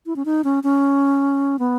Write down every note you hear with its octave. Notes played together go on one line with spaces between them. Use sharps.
E4
C#4
D#4
C#4
C#4
B3